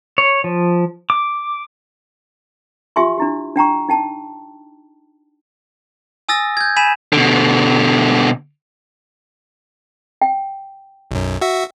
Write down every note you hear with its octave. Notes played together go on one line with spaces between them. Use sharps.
C#5
F3
D6
F4 G4 E5 G#5 C6 C#6
D4 E4 G4
D4 G5 A#5 C#6
D#4 G5 A5
G#5 D#6 E6 A6 A#6
G6 G#6
G#5 B5 B6 D#7 E7
B2 D3
G5
B1 F#2
F#4 E5